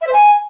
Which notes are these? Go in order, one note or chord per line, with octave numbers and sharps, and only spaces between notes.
E5
C5
G#5